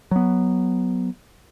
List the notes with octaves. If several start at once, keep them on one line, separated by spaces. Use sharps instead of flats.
F#3 B3